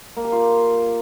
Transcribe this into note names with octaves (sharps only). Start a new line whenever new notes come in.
A#3
G4
F4